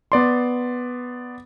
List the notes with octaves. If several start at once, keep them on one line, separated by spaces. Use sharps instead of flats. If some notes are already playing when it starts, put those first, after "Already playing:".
B3 D5 C6